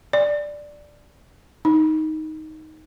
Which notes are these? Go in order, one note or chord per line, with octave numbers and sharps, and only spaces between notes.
D5
D#4